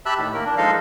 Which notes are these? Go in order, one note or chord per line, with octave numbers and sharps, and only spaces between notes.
G4 E5 A5 B5 E6 F#6
A2 D#3
A#3 A#4
D4
F3 G#3 D#4 A4 D#5 F5